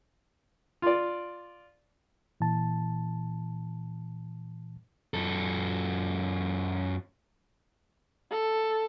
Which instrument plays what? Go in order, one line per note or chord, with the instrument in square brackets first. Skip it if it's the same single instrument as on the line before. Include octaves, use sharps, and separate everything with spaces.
[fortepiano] F4 D5
[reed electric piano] A#2 E3 A5
[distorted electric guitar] F#2 A4
[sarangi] A4